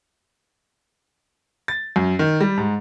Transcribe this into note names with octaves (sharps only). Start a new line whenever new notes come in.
A6
F#2
D#3
G3
G#2